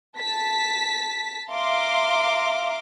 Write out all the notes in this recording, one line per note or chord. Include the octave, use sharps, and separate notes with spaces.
A5 B6
E5 F5 A#5 C6 D6